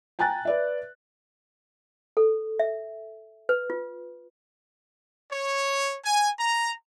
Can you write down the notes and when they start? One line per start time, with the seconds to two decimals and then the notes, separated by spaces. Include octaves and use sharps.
0.19 G5 G#5 A#5 F#6 A6
0.45 B4 D5 E5
2.17 A4
2.59 E5
3.49 B4
3.70 F4
5.30 C#5
6.04 G#5
6.39 A#5